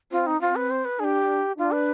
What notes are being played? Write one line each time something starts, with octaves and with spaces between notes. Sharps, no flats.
C4 F4
D#4
C4 F4
B4
C5
B4
D4 G4 G#4
D4 F4
B4